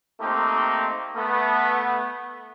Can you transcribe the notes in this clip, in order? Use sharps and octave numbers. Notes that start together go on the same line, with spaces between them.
A3 A#3 C4 D#4 G4
A3 B3